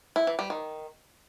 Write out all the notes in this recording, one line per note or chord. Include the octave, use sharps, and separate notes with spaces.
E4
E3
G3
D#3